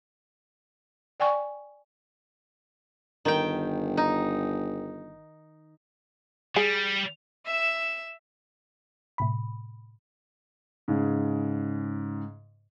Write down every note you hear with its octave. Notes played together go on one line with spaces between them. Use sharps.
D5 G5 G#5 C#6
G1 D#3 G5
D#4
G3 G#4
E5 E7
A2 C3 B5
G#2 C#3